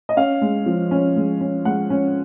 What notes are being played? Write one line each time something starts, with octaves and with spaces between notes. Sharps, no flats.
D#5
C#4 F5
G#3
F3
C#4
G#3
C#4
G#3 F#5
C#4